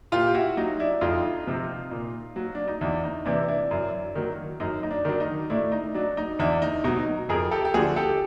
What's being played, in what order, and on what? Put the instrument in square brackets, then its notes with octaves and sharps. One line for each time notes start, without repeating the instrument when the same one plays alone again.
[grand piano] A#2 F4 G4
G4
E4 F#4
F#3 D#4
D4 E4
F2 D#4 F4
C3 F3
A#2
F#3
D4
D#4
E2 D4 E4
D#4
C3 E3 D4 E4
D4 E4
F#2
D#3 F#3
F#2 D#4
D#4
D4
D#3 F#3 D4
D#4
A2 D4 E4
D#4
F#3 D4
D#4
E2 D4 E4
D#4
B2 F#3 D#4
F2 G#4 A#4
G4 A4
G4
D3 F3 F#4 G#4
G4 A4